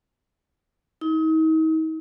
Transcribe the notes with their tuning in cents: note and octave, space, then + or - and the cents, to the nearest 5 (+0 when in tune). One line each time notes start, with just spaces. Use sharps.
D#4 +40